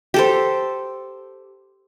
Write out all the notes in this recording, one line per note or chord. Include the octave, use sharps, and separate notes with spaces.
G4 A4 C5